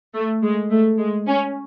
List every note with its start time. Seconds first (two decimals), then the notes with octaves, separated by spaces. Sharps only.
0.14 A3
0.43 G#3
0.71 A3
0.99 G#3
1.27 C#4